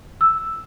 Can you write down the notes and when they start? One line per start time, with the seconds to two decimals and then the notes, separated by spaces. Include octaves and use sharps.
0.21 E6